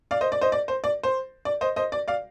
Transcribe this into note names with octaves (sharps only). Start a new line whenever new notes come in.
D5 F5
C5 D#5
D5
C5 D#5
D5
C5
D5
C5
D5
C5 D#5
C5 D#5
D5
D5 F5